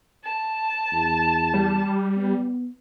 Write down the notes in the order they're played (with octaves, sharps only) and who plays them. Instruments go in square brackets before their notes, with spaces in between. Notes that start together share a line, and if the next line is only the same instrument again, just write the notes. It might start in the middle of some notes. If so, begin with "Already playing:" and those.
[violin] A5
[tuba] E2
[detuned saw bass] G3
[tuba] B3